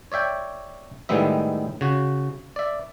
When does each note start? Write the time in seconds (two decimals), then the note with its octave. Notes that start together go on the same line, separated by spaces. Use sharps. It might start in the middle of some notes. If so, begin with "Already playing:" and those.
0.12 C#5 D5 E5 G5
1.09 A2 D#3 G3 G#3 B3 E5
1.81 C#3 F#4
2.56 D5 E5